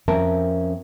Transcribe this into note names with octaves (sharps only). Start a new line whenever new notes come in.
F2 C4 C#4 A#4 E5 A5